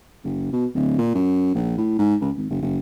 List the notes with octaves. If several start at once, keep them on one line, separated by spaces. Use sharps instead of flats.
F#1
B2
D1
A#2
F#2
A#1
A2
G#2
C#2
G#1
F#1
F#1